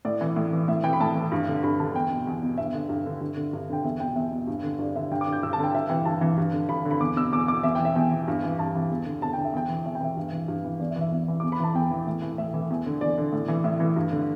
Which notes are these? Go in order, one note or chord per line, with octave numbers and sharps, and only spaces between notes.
A2 D5
E3
A2
E3
A2 E5
E3 G5
B5
A2 A5
E3
G2
D3
G2 B5
D3 A5
E2 G5
B2
E2
B2
G2 E5
D3
G2
D3
G2
D3
G2
D3 G5
E2 E5
B2 G5
E2 E5
B2
G2
D3
G2 D5
D3 E5
G2 G5
D6
D3
G6
G2 E6
A5
D3 G5
G2 E5
E3 G5
G2 A5
E3
G2
D3
G2 B5
D3
B5
E2 D6
B2 E6
E2 D6
B2 D6
E2 E5
E3 G5
E5
E2 G5
E3
G2
E3
G2 A5
E3
E2
D3
E2 A5
D3 G5
E5
E2 G5
E3
E2 E5
G5
E3 E5
G2
E3
G2
E3
E2 D5
E5
E3
E5
E2
E3
E2 D6
B5
E3 A5
E2 G5
E3
A2
E3
A2 E5
E3
E2
D3
E2 D5
D3
A2
E3
A2 E5
E3
G2
D3